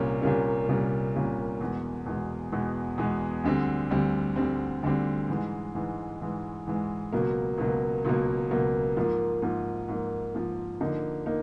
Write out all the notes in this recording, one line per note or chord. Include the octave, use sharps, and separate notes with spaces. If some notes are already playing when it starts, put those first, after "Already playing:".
Already playing: C2 A#2 G3 A#3 C#4
C2 A#2 G3 A#3 C#4
C2 A#2 G3 A#3 C#4
C2 A#2 G3 A#3 C#4
E2 B2 G#3
E2 B2 G#3
E2 B2 G#3
E2 B2 G#3
D2 D3 G3 C4
D2 D3 G3 C4
D2 D3 G3 C4
D2 D3 G3 C4
G#2 E3 G#3
G#2 E3 G#3
G#2 E3 G#3
G#2 E3 G#3
C#2 B2 F#3 A#3
C#2 B2 F#3 A#3
C#2 B2 F#3 A#3
C#2 B2 F#3 A#3
G#2 F3 A#3
G#2 F3 A#3
G#2 F3 A#3
G#2 F3 A#3
D3 F3 A#3 D#4
A#3 D#4